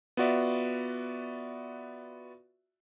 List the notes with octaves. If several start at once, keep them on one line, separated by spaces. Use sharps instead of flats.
B3 F4 F#4 D5 E5